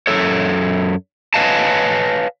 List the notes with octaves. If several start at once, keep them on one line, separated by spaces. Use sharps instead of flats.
F#2 A4 C#5
B4 C#5 D#5 F5 G#5 A5